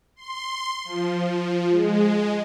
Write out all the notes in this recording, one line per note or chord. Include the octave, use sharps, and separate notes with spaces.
C6
F3
G#3